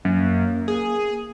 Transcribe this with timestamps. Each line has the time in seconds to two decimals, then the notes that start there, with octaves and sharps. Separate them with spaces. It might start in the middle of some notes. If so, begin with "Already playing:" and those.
0.05 F#2 A#3
0.68 G#4